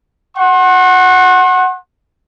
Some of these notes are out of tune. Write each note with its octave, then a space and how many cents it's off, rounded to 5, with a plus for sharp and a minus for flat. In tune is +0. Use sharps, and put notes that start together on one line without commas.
F#5 +0 C6 +45